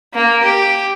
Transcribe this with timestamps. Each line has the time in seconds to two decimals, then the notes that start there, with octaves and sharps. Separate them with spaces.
0.14 A#3
0.43 G4